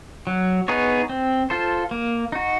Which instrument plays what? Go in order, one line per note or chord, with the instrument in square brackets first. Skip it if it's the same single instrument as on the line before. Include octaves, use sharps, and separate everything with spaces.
[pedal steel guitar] F#3
B3 D#4 G#4 C#5
C4
F4 A4 C5
A#3
D#4 F#4